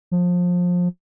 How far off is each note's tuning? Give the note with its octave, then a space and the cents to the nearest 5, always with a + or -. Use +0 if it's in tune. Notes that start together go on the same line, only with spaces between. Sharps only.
F3 +25